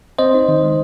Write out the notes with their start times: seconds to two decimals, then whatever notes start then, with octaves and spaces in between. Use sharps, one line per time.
0.18 C4 C5 D#5
0.34 D#4
0.48 D#3
0.63 G#3